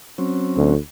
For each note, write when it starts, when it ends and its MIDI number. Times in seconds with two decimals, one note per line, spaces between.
0.18 0.75 54
0.18 0.75 60
0.18 0.75 61
0.57 0.78 38